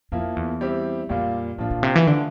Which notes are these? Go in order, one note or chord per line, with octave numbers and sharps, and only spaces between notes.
F2 F3 A#3 E4
E2
G3 C4 E4 G4
F2 A#2 G3 A#3 F4
A2 F3 A#3 D4 F4
A#2
C3
E3
D3 F3 A3 D4